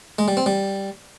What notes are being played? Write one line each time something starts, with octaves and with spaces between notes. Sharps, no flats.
G#3
G3
C4
G3